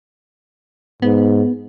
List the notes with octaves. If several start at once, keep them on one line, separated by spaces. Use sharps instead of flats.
G#2 B3